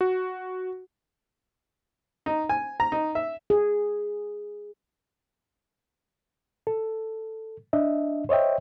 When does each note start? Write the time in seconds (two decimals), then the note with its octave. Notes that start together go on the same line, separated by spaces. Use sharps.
0.01 F#4
2.26 D#4
2.49 G#5
2.80 A#5
2.92 D#4
3.15 E5
3.50 G#4
6.67 A4
7.73 D4 D#5 E5
8.29 C5 C#5 D#5 E5 G5